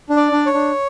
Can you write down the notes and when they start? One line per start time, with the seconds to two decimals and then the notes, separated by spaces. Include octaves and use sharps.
0.10 D4
0.17 D5
0.32 D4
0.46 C#5
0.54 D4